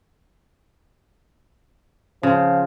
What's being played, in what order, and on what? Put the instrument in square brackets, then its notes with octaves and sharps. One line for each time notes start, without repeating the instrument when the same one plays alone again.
[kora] C#3 [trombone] F3